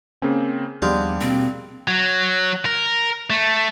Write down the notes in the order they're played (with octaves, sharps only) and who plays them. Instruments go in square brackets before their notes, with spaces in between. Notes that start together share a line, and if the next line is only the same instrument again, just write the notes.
[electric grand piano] C#3 A#3 C4 [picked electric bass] C#4
[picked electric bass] D#2 F3 B3 [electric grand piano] G3 D4 [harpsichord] G#3 G4 F5
[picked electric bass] B2 A#3 [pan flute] C4
[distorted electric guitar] F#3
A#4
A3